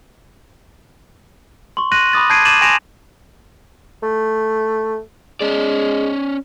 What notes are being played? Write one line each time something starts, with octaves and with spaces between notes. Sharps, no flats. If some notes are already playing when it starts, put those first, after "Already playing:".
C6 C#6
C6 F#6 A#6 D#7 F#7
B5 D6 D#6 A6
A5 G6 G#6 C7 D7 D#7
D6 G6 A6 D#7 E7 F#7
G#5 C6 A#6 D7 E7 F7
A3
G#3 C#4 D5